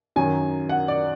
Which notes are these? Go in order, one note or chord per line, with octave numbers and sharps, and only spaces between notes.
F#2 D#3 F#3 G#5
F#5
D5